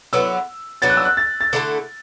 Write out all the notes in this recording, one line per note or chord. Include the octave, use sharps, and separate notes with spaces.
D3 F#3 B3 E4 E6
F#3 B3 D4 A6
F#6
E6
F#6
A6
A6
D3 A3 E4 A4